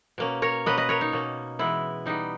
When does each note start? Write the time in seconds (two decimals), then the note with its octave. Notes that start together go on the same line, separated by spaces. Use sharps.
0.18 B2 A#3 C#4
0.42 A#4 C#5
0.66 B2 A#3 C#4 B4 D#5
0.77 B4 D#5
0.89 A#4 C#5
1.01 D#4
1.13 B2 A#3 C#4
1.59 E3 G#3 B3 E4
2.06 E3 G3 B3 D#4